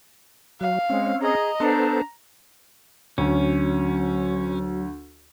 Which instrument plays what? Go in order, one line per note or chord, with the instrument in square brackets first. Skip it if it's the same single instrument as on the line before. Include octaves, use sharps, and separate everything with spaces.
[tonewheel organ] F#3 [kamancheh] F5
[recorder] G#3 [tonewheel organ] C4 C#4
[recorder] G#4 [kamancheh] D#5 A#5
[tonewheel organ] B3 A4 C5 [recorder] D4 [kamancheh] A#5
[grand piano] D2 [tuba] F#3 [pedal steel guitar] C#4